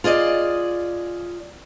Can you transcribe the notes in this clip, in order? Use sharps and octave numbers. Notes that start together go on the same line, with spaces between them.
F4 G#4 D5 D#5